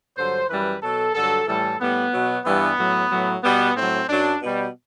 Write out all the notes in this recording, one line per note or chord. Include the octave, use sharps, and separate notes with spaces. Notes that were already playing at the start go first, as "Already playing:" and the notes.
G2 D3 F#3 C5
F#2 E3 G3 B4
B2 F#3 A4
G2 D3 F#3 A4
A2 E3 G3 A4
A2 G3 B3
B2 F#3
G2 E3 G3 B3
A2 F#3
A2 F#3
B2 G3 B3
A2 F#3 C4
F#2 F#3 D4
B2 G3